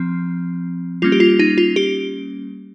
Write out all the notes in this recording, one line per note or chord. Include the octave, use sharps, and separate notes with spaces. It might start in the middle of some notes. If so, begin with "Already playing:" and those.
Already playing: F3 C4
G3 A#3 C#4 F4
G4
F4
D#4
F4
G4